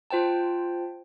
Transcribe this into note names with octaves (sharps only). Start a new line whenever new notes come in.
F4 C5 G5 A5